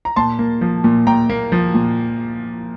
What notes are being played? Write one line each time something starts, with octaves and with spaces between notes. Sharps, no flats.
A#5
A#2 A5 C6
A#3
F3
A#2
A#2 G5 A#5
A#3
F3
A#2